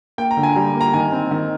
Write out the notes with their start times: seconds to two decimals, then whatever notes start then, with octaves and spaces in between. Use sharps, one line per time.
0.18 A#3 G5
0.31 A#5
0.37 D3
0.43 G#5
0.56 G3 A#5
0.75 A#3
0.81 A#5
0.93 D#3 G#5
1.12 C4
1.31 D#3